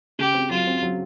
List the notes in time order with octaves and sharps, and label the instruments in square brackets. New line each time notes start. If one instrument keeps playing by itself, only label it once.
[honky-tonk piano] C#3 [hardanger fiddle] G4
[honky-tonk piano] C4
[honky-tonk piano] F#3 [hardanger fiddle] F4
[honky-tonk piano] C4
F#3